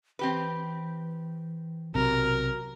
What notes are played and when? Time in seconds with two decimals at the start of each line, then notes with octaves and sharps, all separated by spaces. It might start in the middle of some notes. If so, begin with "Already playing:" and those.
0.19 E3 C4 G4 B4
1.95 B1 C3 F#4 A#4